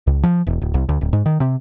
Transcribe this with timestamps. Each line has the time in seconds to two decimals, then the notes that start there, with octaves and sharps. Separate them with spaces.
0.07 C#2
0.23 F3
0.47 E1
0.62 D1
0.74 C2
0.89 D2
1.01 D1
1.13 G#2
1.26 D#3
1.40 C3